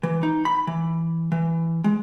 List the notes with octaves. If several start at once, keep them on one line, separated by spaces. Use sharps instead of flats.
E3
D#4
B5
E3
E3
G#3